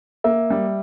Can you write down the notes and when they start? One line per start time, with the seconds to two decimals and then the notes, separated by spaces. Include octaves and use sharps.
0.24 A#3 E5
0.50 G3